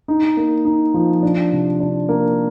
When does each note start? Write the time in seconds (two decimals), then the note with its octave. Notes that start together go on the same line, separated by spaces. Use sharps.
0.08 D#4
0.37 A#3
0.65 D#4
0.94 F3
1.23 D4
1.52 C3
1.80 D4
2.09 A#3